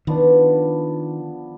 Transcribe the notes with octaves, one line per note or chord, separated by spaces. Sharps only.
D#3 F3 B3 D4